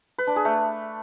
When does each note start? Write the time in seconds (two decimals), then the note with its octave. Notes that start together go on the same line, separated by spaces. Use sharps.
0.18 B4
0.27 D4
0.36 G#4
0.45 A3